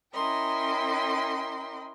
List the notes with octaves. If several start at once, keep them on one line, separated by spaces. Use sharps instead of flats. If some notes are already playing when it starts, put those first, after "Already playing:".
C#4 E4 A#4 D#5 G5 C6